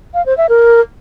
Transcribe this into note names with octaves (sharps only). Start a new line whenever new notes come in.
F5
C5
E5
A#4